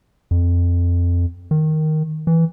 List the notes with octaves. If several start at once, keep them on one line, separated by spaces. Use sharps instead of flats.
F2
D#3
E3